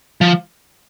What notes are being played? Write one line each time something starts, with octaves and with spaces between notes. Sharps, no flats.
F3